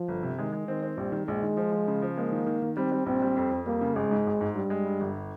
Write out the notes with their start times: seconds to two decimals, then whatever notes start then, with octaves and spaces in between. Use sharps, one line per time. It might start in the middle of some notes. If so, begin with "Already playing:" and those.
Already playing: F3
0.08 G1
0.23 C3
0.38 D#3 G#3
0.53 G#3
0.68 D#3 C4
0.83 C4
0.97 A#1 G3
1.12 D#3
1.27 A#1 G#3
1.42 D#3
1.57 F3
1.72 F3
1.88 C#3
2.02 F3
2.17 G#3 A#3
2.32 D#3
2.46 D#3
2.62 D#3
2.77 G3 C4
2.92 G3
3.06 A#1 C4
3.22 G3
3.36 F2
3.51 F2
3.66 G3 A#3
3.81 C#3
3.96 G#1 G#3
4.11 G#2
4.27 G#1
4.41 G#2
4.55 G2 G3
4.70 G#3
4.86 G2
5.01 G1